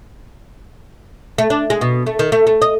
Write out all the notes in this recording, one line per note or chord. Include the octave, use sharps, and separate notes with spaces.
A3
D4
G#3
B2
A3
D#3
A3
A3
D#5